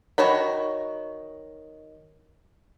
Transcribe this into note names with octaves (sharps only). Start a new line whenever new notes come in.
D#3 F#4 C#5 B5